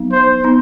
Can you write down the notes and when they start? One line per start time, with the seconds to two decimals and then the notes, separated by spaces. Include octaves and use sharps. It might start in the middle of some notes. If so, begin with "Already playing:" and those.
Already playing: F#3 B3 D#4
0.12 C5
0.44 B3 D#4